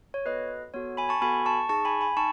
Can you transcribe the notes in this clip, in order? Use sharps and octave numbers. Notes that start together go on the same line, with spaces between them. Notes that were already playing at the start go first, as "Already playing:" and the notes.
C#5
B3 F#4 A4 B4 D#5
B3 F#4 A4 C#5
G#5 B5
A5 C#6
B3 F#4 A4 G#5 B5
A5 C#6
D#4 G#4 A5 C#6
G#5 B5
G#5 B5
D#4 A5 C#6